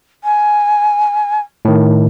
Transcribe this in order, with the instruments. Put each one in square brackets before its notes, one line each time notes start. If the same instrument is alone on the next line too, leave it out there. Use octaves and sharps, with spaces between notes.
[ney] G#5
[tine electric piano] A2 D#3